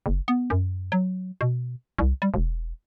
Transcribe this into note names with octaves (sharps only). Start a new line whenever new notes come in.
F#1
B3
F#2
F#3
B2
C2
G3
E1